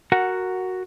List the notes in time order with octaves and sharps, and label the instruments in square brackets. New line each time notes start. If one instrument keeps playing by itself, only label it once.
[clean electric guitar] F#4 A#4 F#5